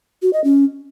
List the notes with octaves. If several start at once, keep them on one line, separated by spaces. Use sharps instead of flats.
F#4
D#5
C#4